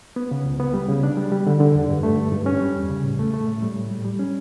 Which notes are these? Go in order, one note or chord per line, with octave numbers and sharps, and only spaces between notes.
B3
C#3
C#2
B3
G3
C#3
D4
G3
G3
D3
D3
E2
G2
A3
G2
G2
C#4
G3
E2
C#3
A2
A3
A3
A2
G3
A2
G3
G3
C#4